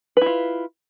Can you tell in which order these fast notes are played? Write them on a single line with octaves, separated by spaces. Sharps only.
B4 E4 F4